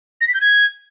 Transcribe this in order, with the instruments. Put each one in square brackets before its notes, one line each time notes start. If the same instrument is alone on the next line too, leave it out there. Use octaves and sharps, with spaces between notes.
[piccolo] A#6
B6
G6
G#6